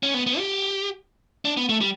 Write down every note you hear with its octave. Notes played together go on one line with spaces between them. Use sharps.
C#4
B3
B3
G4
D4
B3
A3
G3